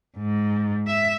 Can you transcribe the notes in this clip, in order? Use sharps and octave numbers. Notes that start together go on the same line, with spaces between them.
G#2
E5